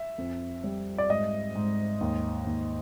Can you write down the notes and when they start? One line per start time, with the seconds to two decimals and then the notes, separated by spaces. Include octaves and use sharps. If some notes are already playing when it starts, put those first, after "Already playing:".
Already playing: E5
0.18 F2
0.64 G3
0.98 D5
1.09 G#2 D#5
1.55 G#2
2.01 D#2
2.47 D#2